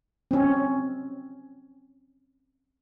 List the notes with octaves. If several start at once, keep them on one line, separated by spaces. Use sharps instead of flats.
C4 C#4